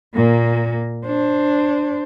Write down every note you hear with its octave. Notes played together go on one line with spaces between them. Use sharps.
A#2 A#3
D4 C5